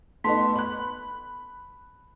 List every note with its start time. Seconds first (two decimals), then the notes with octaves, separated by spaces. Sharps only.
0.24 A3 B3 D#4 A5 C6 B6
0.56 B5 F#6